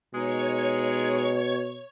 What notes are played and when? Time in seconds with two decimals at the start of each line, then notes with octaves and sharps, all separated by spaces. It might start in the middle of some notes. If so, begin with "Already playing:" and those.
0.14 B2 G#3 D#4 C#5 C#6 G#6